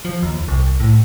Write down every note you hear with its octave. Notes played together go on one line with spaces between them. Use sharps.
F3
D#2
C2
A2